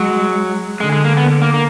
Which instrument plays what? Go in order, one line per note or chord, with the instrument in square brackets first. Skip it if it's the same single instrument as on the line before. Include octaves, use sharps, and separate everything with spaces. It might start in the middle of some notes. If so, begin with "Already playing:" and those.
Already playing: [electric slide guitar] F#3 [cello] G#3
[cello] D3 [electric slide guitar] G#3
[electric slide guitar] G#3
A#3
B3
A#3
A#3